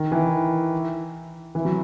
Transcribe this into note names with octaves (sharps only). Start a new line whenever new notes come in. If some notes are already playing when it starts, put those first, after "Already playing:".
Already playing: D#3
E3
E3
F#3